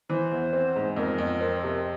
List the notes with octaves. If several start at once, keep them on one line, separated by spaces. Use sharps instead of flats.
E3 C5
E2
C4
G#2
F2 A#4
F2
C4
C3